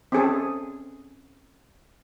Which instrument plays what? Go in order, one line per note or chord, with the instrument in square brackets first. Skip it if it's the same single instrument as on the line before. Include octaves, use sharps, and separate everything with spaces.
[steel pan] C4 C#4 G#4 A4